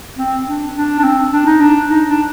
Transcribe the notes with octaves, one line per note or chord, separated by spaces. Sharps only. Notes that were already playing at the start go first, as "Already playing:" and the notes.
C4
D4
D4
D4
C4
D4
D#4
D4
D#4
D4